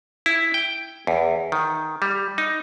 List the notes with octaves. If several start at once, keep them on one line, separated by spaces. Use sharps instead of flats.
E4
G5
E2
D#3
G3
D#4